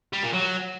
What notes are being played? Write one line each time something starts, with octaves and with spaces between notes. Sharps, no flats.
G3
A#2
F#3